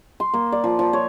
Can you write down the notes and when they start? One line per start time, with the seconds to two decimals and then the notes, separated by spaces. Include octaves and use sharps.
0.20 C6
0.34 A#3
0.52 D5
0.64 F3
0.79 F3
0.93 C#5